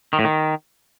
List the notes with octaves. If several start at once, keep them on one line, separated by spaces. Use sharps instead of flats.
D#3
A2
D#3